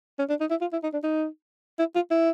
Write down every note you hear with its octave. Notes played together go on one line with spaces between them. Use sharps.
C#4
D4
D#4
E4
F4
E4
D#4
D4
D#4
E4
F4
E4